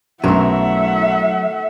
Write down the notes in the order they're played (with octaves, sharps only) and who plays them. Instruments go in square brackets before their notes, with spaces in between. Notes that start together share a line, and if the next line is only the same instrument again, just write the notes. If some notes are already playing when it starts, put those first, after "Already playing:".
[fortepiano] B1 F#2 [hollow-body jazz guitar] F#3 [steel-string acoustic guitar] A3 A#4 [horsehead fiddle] E5 F#5